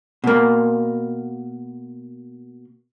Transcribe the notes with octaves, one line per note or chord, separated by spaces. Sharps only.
B2 A#3